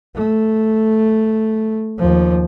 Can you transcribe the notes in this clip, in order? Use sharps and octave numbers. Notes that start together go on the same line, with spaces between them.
A3
D#2 F3